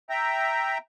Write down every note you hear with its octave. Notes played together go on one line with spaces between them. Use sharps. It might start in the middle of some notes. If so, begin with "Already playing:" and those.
E5 G5 A#5